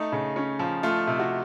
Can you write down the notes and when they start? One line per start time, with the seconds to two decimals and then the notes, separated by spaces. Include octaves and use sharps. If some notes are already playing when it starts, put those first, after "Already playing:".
Already playing: A3 D#4
0.12 C#3
0.36 C#4
0.59 F3
0.83 A3 F4
1.07 C3
1.19 F#4